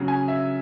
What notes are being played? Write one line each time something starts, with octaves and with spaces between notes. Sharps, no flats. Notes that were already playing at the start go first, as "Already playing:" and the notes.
Already playing: C#3 F#3
G#5
E5